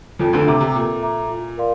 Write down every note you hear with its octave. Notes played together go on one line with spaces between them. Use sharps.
F2 F3 A4
D2 D3
C3 E5 A#5 D6
C3
A#2 A4
E5 A#5 D6
F4
A#4 D5 F5 C6